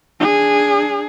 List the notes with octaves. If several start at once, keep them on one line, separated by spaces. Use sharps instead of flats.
D4 G#4